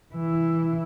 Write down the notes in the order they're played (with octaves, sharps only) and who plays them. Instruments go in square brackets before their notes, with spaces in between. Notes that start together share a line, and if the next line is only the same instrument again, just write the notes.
[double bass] E3 E4